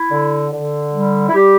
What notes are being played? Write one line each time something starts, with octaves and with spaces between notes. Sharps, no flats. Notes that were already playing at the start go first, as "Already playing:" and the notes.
Already playing: E4
D3
D3
G3
E4
G3 G4